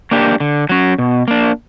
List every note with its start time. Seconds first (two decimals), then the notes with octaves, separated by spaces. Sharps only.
0.11 A#3 D4 G4
0.40 D3
0.69 F#3 C#4
0.99 B2
1.28 A#3 D4